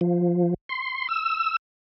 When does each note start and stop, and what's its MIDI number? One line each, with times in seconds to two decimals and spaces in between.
0.01 0.54 53
0.69 1.08 84
1.09 1.57 88